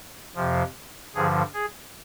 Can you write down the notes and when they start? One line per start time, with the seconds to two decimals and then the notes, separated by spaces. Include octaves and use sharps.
0.36 F2 C3 F3
1.15 G2 D3 F3 G#4
1.54 G#4